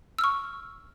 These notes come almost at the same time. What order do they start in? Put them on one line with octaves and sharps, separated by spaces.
E6 F6 C#6